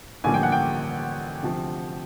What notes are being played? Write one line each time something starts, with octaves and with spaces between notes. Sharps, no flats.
A1 G2 D3 F3 A#3 G#5
G5
F#5
G5
D2 C3 F3